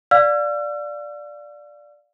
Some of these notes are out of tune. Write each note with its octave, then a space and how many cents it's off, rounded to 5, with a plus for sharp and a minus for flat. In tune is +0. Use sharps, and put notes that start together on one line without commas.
D5 +0 F5 +15 E6 +45